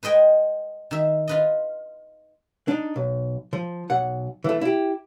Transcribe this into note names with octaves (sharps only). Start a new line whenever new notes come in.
B4 C5 D#5 G5 G#5
D#3 E5
F4 B4 D#5
D4 D#4
B1
F3
B1 F#5
E3 A3
E4 G4